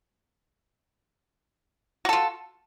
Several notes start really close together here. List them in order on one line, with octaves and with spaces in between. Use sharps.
F#4 A4 F4